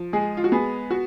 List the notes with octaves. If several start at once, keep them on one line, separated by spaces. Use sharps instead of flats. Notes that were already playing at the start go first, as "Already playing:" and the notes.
Already playing: F3
G#3 G#4
F4
F#4
B3 G#4
F#4